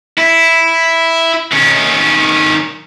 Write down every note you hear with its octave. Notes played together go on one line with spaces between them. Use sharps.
E4
D#3 C#4